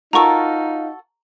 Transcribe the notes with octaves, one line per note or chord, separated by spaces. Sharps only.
D#4 F4 F#4 A4 A#4 A#5 C#6